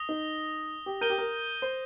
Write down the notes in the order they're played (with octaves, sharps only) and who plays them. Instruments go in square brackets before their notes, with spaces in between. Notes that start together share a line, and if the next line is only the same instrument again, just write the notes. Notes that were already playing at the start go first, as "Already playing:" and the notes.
Already playing: [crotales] D#6 A#6 G7
[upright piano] D#4
G4
[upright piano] A#4 [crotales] G6 D#7 G7
[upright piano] G4
A#4
C5